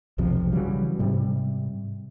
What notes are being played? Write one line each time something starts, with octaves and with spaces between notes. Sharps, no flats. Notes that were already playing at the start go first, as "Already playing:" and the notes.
B1 F2 C3 F3
C#3 E3 F#3 G3
G#2 C3 G3